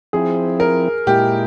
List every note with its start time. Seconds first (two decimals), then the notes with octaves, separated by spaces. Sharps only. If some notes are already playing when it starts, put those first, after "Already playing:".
0.13 F3 C4 E4 G#4
0.60 A#4
1.07 A#2 G#3 E4 G4